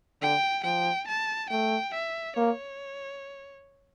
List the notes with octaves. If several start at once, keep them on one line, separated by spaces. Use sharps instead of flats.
D3 G5
F3 G5
A5
A3 G5
E5
A#3 C#5